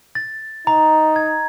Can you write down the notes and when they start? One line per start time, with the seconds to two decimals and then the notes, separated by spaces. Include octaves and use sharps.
0.15 A6
0.67 D#4 A#5
1.16 G#6